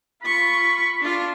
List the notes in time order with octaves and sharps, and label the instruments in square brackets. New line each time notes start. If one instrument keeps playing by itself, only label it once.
[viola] F4 C#6 [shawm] B5
[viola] D4 F4